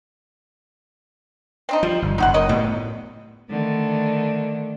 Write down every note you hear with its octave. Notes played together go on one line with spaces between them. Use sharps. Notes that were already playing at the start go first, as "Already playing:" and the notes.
C4 D4 D#4
F3 G3
G1
F#1 D#4 F#4 F#5
A#4 C#5 D#5
A2 G3 B3
D3 D#3 A3